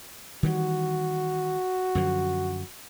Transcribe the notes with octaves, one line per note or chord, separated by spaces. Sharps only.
D#3 E3 G3 F#4
F#2 D3 F3